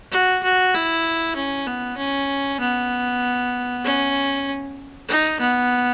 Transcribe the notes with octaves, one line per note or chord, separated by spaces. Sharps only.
F#4
F#4
E4
C#4
B3
C#4
B3
C#4
D#4
B3